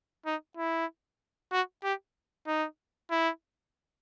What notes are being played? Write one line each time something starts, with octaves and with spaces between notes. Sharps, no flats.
D#4
E4
F#4
G4
D#4
E4